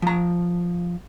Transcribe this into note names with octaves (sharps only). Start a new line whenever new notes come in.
F3 A#5